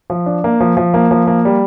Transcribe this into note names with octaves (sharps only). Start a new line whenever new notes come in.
F3
D4
A#3
F3
F3
A#3
F3
A#3
G3